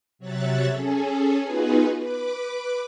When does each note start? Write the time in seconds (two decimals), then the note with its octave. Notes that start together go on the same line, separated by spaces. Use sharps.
0.19 C3 F#3 C#5 E5 F#6 A6
0.70 C#4 G#4 A4
1.43 B3 D#4 F4 F#4 G#4 B4
1.99 B4 D6